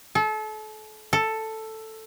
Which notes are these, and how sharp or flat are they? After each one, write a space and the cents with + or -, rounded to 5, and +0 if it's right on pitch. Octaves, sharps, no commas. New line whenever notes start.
A4 -35
A4 +5